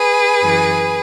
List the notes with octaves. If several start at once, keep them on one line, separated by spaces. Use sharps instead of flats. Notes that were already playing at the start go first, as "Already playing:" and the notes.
Already playing: G#4 B4
F#2 E3